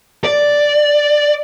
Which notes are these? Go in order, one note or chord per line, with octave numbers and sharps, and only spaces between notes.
D5